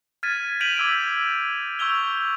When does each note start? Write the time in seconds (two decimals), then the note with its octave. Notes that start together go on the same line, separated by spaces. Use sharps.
0.23 F6 G#6 A6 B6 D#7
0.60 G6 B6 D7 D#7 F7 F#7
0.76 D6 E6 G#6 D7
1.79 C#6 E6 G6 F7 G7